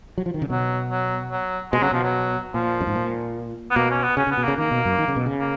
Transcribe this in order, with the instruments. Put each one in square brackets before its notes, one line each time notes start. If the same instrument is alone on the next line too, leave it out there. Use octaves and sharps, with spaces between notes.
[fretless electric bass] F#3
F3
D#3
C#3
[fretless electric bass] B2 [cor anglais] F#3
[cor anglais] F#3
F#3
[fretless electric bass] B2 [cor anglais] G#3
[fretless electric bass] C#3 [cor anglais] F#3
[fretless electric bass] B2 [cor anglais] F3
[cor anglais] F#3
[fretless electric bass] A#2 [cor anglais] F3
[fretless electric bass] F#2
G#2
A#2
[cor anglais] B3
[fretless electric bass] B2 [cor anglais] A#3
[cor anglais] C#4
B3
[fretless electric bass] C#3 [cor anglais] C#4
[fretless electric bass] C#3
[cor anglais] B3
[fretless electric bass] B2
[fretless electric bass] C#3 [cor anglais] A#3
[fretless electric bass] D#3 [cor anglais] A#3
[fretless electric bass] B2
F#2
D#3
C#3
B2
C#3
[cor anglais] A#3